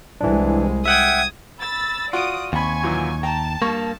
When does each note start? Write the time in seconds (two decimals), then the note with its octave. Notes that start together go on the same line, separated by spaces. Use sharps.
0.21 C2 E3 G#3 D4
0.86 E5 F#5 G5 D#6 G#6
1.58 B5 E6 A6
2.13 F4 F#4 D5 F#5 D#6 D7
2.53 D#2 C4 G#5 B5 C#6 G#6
2.83 F#2 A#2 E3
3.23 G5 A5 A#5
3.62 G2 A#3 C#6